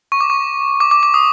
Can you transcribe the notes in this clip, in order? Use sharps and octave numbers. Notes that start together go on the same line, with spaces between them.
C#6
D6
C#6
D6
D6
D6
D#6